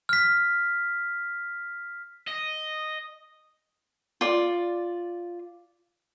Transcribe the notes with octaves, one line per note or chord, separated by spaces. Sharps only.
F6 B6
D#5
F4 D5